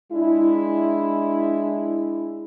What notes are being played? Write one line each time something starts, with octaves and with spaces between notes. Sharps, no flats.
G#3 D4 E4